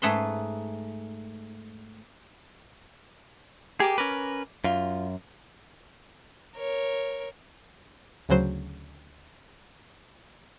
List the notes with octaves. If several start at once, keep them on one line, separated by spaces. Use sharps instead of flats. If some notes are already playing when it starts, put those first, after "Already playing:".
G#2 A3 G#4 B4 B5 C6
G4 G#4 A#4 D6
C#4 A#4 B4 D6
F#2 F4
A#4 C#5
D2 C#3 F#3 C5